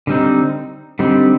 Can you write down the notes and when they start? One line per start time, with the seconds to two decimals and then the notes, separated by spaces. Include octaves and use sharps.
0.07 D3 G3 C4 D#4
0.99 D3 G3 C4 D#4